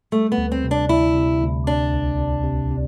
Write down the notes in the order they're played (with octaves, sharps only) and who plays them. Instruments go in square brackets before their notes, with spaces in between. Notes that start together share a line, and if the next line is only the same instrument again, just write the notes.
[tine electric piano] G3 [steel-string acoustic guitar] A3
[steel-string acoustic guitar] B3
[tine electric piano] D2
[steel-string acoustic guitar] C4
[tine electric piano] C3
[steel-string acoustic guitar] D4
[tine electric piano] D2 [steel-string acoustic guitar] E4
[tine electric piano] C3
D2
[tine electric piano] C3 [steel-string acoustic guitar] D4
[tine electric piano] C2
C3
C3
C3